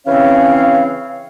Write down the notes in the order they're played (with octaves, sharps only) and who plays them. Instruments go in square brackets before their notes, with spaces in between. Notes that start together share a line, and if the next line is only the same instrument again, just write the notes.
[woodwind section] C#3 E3 C4 C#4 C#5 F5